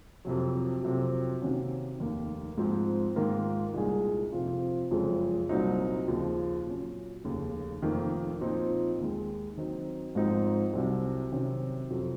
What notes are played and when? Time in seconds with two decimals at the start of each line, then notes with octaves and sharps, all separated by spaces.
0.25 F2 C3 F#3
0.83 F2 C3 F#3
1.41 C3 D#3 A#3 C#4 F#4
2.00 F1 D#2 D#3 A#3
2.58 G#2 F3 C4
3.16 G#2 D#3 A#3 F4 A#4
3.74 C2 A#2 G#3 D#4 G#4
4.32 F2 C3 F3 C4 F4
4.91 F#1 F2 C#3 F3 G#3
5.49 C2 A#2 F#3 C4 D#4
6.08 D#2 C#3 F3
6.65 A#2 F#3 C#4
7.24 F1 D#2 C#3
7.82 F1 F2 D#3 A#3
8.41 A#2 F3 C4 D#4
8.99 D#2 D#3 G#3
9.57 D#3 F#3 C4 D#4
10.15 G#1 G#2 F3 C4 D#4
10.74 C2 C3 F#3
11.32 C3 D#3 F#3 C#4
11.90 F2 C3 F#3